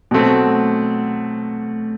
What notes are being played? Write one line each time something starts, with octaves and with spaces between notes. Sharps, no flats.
B2 F#3 A3 C4